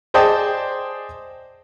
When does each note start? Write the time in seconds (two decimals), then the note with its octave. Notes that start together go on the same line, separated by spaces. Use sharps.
0.14 G#4 C5 D5 D#5 G5 A5